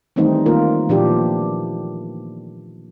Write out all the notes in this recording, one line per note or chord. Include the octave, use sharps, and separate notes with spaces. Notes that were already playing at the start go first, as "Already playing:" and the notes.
D#3 E3 G3 A3 C4 D#4
D#3 A#3 F4 A#4
A#2 E3 F3 D4 G4